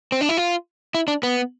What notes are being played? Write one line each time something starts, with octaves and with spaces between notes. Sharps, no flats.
C4
D4
E4
F4
E4
D4
B3